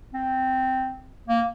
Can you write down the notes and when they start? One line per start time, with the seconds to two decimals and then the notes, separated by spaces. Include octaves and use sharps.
0.14 C4
1.28 A#3